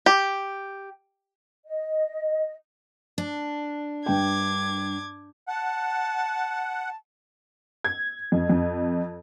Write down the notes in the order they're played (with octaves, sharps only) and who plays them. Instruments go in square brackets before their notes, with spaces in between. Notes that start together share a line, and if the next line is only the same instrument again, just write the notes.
[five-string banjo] G4
[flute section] D#5
[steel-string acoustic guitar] D4
[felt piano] G2 G5 [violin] D6 G#6
[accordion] F#5 [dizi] A5
[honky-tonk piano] G#6
F2
F2